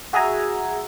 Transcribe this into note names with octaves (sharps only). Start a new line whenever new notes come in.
F#4 G#4 E5 G#5 A#5